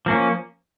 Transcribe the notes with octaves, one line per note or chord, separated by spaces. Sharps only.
F3 A#3 C#4